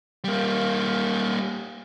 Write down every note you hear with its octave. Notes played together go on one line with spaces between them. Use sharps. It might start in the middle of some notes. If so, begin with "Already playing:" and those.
G3 A#3